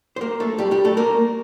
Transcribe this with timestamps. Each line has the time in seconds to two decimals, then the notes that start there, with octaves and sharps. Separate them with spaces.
0.16 C5
0.21 A#3 A#4
0.40 A3 A4
0.58 G3 G4
0.71 G3 G4
0.85 A3 A4
0.97 A#3 A#4